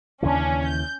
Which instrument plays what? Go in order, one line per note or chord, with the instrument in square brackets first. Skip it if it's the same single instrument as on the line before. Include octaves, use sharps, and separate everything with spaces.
[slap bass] D#2 C#3 E3 [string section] C#4 D4
[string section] G6